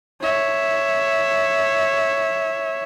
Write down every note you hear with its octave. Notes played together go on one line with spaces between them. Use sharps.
C#5 E5